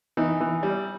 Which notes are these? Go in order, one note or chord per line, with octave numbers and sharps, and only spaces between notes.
E3 D#4
E3
G3